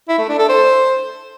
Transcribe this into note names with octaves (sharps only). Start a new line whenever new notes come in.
E4
A3
D4
A4
C5